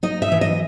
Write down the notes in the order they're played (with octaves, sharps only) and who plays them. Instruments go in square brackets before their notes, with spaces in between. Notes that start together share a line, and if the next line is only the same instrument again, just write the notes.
[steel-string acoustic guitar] D#4 D#5
E5
E3
D#5